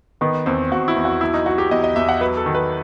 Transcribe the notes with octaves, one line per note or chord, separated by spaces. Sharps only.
D#3 B3
E2 C4
E2 F#4
E4
E2
F#4
F#3 E4
D#4
F#3 F#4
G4
E2 D#5
D#5
E2 E5
F#5
F#3 B4
A4
D#3
B4